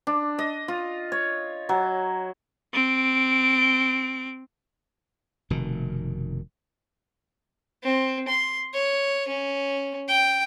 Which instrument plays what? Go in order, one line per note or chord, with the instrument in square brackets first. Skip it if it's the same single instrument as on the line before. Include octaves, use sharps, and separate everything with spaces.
[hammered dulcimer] D4
D#5
F4
C#5
F#3
[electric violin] C4 D7
[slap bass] F1 B2 D#3
[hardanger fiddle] C4
C6
C#5
C#4
G5